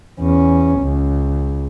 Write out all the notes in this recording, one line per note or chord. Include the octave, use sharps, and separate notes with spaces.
E2 C#4
C#2